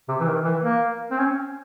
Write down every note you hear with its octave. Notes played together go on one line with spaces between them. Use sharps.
C3
E3
D#3
E3
A#3
C4
C#4